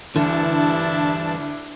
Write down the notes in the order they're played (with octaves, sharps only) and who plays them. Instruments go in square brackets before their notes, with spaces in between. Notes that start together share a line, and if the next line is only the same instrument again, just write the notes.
[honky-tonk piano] D2 [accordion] G2 A5 [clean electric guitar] E3 [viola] D4 E4